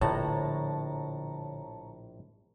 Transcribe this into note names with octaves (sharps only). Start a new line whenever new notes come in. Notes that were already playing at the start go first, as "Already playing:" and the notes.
A#1 A2 D3 C#5 A5 A#5